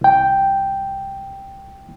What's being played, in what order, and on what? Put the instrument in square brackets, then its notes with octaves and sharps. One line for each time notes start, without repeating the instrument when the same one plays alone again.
[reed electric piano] C2 G5